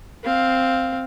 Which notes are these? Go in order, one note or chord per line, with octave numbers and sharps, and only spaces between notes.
C4 F5